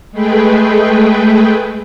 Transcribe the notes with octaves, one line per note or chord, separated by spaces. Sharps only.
G#3 A3 G#4 B4 G5